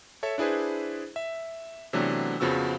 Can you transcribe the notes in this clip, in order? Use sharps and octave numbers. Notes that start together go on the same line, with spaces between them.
A4 C#5 E5
D4 E4 G#4 B4 C5
E5
C3 E3 F#3 A3 B3 D4
F2 C#3 F3 B3 F#4 E6